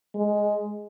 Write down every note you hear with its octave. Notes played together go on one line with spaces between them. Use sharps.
G#3